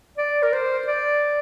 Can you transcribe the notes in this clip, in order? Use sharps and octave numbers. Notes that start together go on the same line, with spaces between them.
D5
A#4
C5
D5